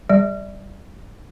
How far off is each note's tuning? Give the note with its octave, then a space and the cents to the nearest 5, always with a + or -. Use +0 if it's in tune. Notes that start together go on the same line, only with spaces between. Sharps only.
G3 +0 D5 +5